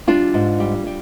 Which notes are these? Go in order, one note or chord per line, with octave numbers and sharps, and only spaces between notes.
G3 D4 F4
G#2
G3
G3